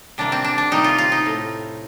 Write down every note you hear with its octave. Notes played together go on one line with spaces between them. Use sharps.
C3 G3 A#3 D4
C4
D4
D4
C3 G3 A#3 D#4
F4
F4
D#4
A2 A3